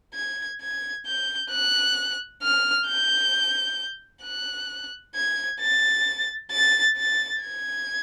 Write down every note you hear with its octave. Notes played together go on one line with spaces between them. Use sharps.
G#6
G#6
G6
F#6
F6
G6
F#6
G#6
A6
A6
A6
G#6